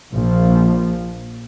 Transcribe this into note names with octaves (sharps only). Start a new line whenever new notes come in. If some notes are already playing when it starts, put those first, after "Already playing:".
A#1 F3